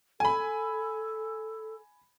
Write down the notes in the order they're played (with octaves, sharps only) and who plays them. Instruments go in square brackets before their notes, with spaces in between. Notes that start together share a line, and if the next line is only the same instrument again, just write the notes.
[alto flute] A4 [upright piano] G#5 B5